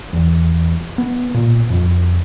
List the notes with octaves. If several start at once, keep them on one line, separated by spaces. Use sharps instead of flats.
E2
B3
A#2
F2